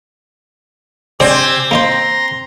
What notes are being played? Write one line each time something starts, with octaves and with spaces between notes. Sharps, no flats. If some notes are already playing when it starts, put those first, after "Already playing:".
G#3 C4 D4 G4 G#4 G#5 E6
A#3 D#4 C5 A#5 C6